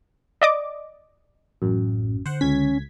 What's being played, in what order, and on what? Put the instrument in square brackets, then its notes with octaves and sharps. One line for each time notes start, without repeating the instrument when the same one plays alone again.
[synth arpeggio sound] D5 D#5 D6
[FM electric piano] A1 F#2 [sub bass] A2
[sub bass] D3 [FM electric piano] C5 F#5
[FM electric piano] C#2 G#6 B6 [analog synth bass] C#4